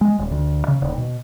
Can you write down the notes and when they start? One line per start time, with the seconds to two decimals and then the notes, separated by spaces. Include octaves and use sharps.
0.01 G#3
0.19 D#1
0.31 D2
0.68 C#3
0.82 D#1
0.98 B2